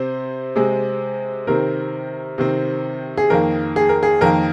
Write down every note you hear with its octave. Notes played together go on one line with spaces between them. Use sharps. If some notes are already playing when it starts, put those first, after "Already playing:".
Already playing: C3 C4 C5
C3 G#3 C4
C3 D#3 C4 A#4
C3 D#3 C4
G#4
F2 D#3 A#3 A#4
G#4
A#4
G#4
F2 D#3 A#3 A#4